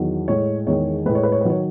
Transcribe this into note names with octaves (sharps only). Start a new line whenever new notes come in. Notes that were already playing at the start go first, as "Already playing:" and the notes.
Already playing: E2 D#3 F#3
A2 G#3 C#5
E2 D#3 G#3 C#5
A2 G#3 B4
C#5
B4
C#5
B4
D#3 F#3 C#5